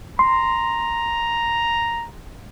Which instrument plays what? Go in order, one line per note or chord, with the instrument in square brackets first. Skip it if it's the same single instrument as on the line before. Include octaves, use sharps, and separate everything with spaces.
[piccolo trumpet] A#5 [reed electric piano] C6